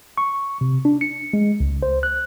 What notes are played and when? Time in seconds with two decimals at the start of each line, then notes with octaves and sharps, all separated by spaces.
0.18 C#6
0.61 C3
0.85 D4
1.01 C#7
1.33 G#3
1.60 C#2
1.83 C5
2.03 F#6